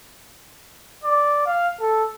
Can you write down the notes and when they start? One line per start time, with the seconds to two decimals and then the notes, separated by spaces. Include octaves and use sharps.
1.04 D5
1.46 F5
1.80 A4